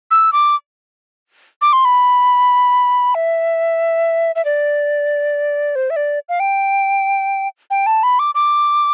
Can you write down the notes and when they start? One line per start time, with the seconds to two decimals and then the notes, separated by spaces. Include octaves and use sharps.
0.11 E6
0.33 D6
1.61 D6
1.73 C6
1.85 B5
3.15 E5
4.35 E5
4.45 D5
5.75 C5
5.90 E5
5.96 D5
6.29 F5
6.40 G5
7.71 G5
7.86 A5
8.03 B5
8.19 D6
8.35 D6